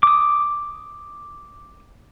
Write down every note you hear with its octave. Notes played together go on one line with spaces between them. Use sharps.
D6 D#6